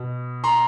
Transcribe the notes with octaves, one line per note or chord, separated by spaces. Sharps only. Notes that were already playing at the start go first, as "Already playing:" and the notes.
Already playing: B2
A#5 C6